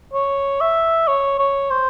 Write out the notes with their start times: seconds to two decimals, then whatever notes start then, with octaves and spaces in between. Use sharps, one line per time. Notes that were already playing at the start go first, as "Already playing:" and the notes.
0.13 C#5
0.61 E5
1.08 C#5
1.39 C#5
1.70 C5